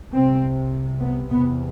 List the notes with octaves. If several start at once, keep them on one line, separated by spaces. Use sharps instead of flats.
C2 C3 C4
B3
E2 C3 B3